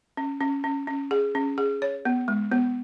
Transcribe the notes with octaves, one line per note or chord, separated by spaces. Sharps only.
C#4
C#4
C#4
C#4
G#4
C#4
G#4
C#5
B3
G#3
B3